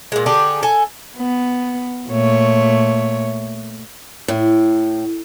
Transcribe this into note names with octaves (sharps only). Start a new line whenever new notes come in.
A#2 G#3
D3 D4 G4 G#4
A4 G#5
B3
A#2 A3 C#5
A2